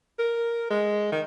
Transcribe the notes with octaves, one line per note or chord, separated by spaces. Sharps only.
A#4
G#3
D#3